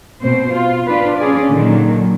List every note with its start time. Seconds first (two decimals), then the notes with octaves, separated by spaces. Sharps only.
0.22 B2 C4 C5
0.54 F4
0.86 D4 F4 B4
1.18 C#4 G#4 D5
1.49 A#2 D3 D#3 F#3